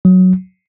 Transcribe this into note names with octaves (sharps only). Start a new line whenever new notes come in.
F#3